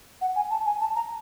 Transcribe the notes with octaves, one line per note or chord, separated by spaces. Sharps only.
F#5
G#5
A5
G#5
A5
A#5